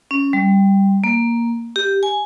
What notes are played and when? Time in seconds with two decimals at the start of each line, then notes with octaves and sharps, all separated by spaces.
0.11 C#4
0.33 G3
1.04 A#3
1.76 G4
2.03 G#5